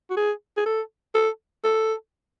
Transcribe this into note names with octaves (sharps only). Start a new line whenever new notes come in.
F#4
G#4
G#4
A4
A4
A4